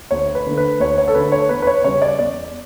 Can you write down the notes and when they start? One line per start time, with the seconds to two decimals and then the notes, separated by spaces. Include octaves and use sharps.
0.11 D2 C#5
0.35 B4
0.46 D3 A3
0.57 B4
0.80 D2 C#5
0.98 C#5
1.08 A4
1.15 D3 A3 B4
1.32 C#5
1.49 E2 B4
1.62 B4
1.67 C#5
1.84 C#3 G3 C#5
2.02 D5
2.19 E2 D5